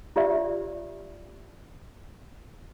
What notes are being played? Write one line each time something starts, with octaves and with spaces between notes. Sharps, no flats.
F4 G4 D5 E5